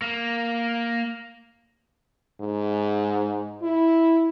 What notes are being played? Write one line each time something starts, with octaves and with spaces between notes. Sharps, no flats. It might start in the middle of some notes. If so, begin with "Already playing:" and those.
A#3
G#2
E4